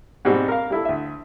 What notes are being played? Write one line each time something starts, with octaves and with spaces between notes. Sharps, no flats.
G#2 B2 G3 C4 F#4
A#4 F5
G3 E4 A4
D2 E5